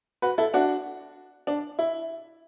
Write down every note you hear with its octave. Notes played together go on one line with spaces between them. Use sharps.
F#4 B4
E4 A4
D4 F#4
D4
E4